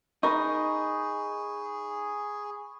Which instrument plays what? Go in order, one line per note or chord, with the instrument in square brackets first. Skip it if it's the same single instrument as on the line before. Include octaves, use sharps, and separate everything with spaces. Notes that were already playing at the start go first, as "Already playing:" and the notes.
[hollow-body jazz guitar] D#4 A#4 [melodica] G#4 [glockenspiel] B5 C#6